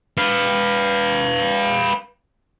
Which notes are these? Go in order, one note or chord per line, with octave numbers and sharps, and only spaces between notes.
B4 F5